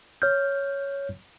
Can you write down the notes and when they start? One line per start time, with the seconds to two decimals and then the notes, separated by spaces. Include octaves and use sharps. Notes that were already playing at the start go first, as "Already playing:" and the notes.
0.22 C#5 F6 G6